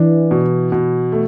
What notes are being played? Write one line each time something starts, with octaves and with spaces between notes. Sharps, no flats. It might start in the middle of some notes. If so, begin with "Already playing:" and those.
Already playing: E3 D4
B2
B2
A3